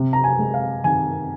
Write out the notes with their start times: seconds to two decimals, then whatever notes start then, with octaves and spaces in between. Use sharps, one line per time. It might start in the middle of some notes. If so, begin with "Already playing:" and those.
Already playing: C3
0.13 A#5
0.24 G#5
0.39 G#3
0.54 F5
0.84 D#3 G#5